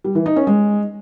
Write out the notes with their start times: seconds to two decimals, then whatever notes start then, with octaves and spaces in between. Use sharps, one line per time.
0.04 G3
0.15 E3
0.26 D#4
0.36 C#4
0.47 G#3